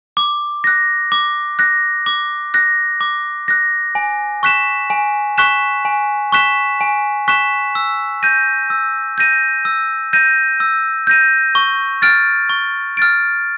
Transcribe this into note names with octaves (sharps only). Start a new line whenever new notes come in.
D6
F#6 A#6
D6
F#6 A#6
D6
F#6 A#6
D6
F#6 A#6
G#5
C#6 F#6 B6 E7
G#5
C#6 F#6 B6 E7
G#5
C#6 F#6 B6 E7
G#5
C#6 F#6 B6 E7
E6
G6 A#6 D#7
E6
G6 A#6 D#7
E6
G6 A#6 D#7
E6
G6 A#6 D#7
C#6
F6 A6 D7
C#6
F6 A6 D7